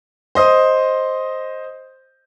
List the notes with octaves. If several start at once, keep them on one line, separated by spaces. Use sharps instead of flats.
C5 D#5 D#6